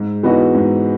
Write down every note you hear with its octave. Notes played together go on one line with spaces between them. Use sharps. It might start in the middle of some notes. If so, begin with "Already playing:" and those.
Already playing: G#2
E3 B3 D#4 F#4
G#2